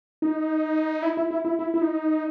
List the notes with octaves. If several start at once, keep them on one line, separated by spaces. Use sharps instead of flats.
D#4
E4
E4
E4
E4
E4
E4
D#4